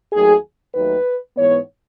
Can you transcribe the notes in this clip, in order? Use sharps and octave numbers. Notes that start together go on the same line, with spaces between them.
D#2 D#3 F#3 A3 G#4
D#2 D#3 F#3 A3 B4
G#2 E3 B3 C#5